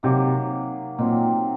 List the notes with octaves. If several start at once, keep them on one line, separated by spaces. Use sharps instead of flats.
C3 D#3 F#3 A#3
A#2 D#3 F#3 C4